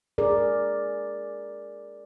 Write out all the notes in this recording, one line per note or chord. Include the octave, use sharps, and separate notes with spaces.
G#4 A#4 D5